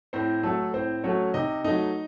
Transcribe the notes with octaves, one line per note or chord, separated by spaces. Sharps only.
A2 C4 C5
F#3 A3 A4
A2 C4 C5
F#3 A3 C#4 C#5
C3 D#4 D#5
F#3 A3 D#4 D#5